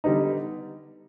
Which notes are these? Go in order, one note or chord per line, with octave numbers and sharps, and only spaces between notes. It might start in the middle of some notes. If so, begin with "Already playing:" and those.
D3 G3 B3 D#4